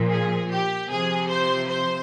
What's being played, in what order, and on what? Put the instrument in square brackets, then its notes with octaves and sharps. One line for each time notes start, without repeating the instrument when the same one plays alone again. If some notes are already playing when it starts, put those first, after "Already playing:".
Already playing: [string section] A#2 F3
G#4
G4
C3 F3 G#4
C5
C5